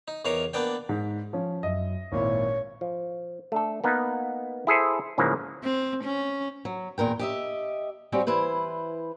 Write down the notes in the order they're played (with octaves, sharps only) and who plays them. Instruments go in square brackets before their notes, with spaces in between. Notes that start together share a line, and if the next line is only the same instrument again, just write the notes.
[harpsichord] D#4
E2 D#3 C#5 F5 A#5 D6
A#3 B3 D4 D5 G5
[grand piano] G#2
F3 C#4
[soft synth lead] F#2 [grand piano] D#5 E5
[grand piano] G#1 A#2 E4 [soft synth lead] C#5
[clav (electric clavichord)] F3
A3 D4 A4
A#3 B3 D#4
E4 G#4 A4 C5
G#2 C#3 E3 F3 A#3
[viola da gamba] C4
C#4
[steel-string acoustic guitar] F#3
E2 A#2 A#4 G5
G4 D#5 E5
G3 C4 C#4 F#4 G4
E3 E4 B4 C5